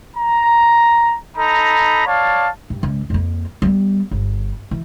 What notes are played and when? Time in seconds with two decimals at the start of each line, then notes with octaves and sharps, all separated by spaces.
0.17 A#5
1.37 D#4 A4 A#5 B5
2.07 C#5 D5 F5 A5
2.70 G2
2.83 C#2
3.10 F2 A#3
3.62 G3 B3
4.11 G1
4.71 E3